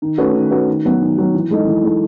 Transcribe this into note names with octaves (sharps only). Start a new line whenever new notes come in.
D#3
A3 C#4 F#4 B4
D#3
A3 C#4 F#4 B4
D#3
F#3 B3
D#3
F#3 B3
E3
G#3 D#4 A4
E3
G#3 D#4 A4